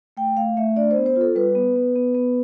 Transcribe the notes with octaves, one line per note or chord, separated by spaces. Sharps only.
A3 G5
A3 F5
A3 E5
D4 D5
C5
B3
C5
F4
A4
G3 B4
B3
B3
B3
B3